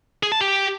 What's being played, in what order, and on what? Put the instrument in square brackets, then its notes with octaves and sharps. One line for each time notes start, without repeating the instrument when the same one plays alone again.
[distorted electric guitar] G#4
A5
G4